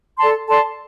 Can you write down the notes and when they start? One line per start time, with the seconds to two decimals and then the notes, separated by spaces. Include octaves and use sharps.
0.18 A4 D5 A5 C6
0.48 A4 D5 A5 C6